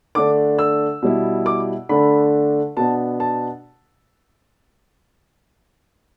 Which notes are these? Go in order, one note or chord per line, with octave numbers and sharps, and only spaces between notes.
D3 A3 D4 D6
E6
B2 G3 E4
D6
D3 A3 D4 B5
B2 B3 D4 A5
A5